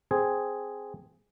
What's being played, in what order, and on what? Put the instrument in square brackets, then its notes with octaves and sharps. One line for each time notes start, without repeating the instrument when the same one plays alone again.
[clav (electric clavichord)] C4 G#4